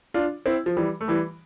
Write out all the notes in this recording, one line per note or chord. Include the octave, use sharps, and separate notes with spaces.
D4 F4
C4 E4
F3
E3 G3
A3
E3 G3